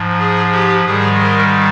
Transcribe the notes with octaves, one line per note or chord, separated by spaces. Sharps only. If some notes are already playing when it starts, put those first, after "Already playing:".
Already playing: G#2 F3
G#4
G4
G#2 D#3 G3 G#4
A#4